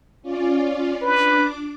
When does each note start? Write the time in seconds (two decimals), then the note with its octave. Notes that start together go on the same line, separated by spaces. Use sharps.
0.22 C#4 F4 D5
1.02 D4 B4 D6